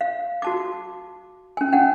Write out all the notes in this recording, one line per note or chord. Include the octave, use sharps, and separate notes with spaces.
F5
F#4 A5 D6
C#4 G#5
C#4 F#5 G5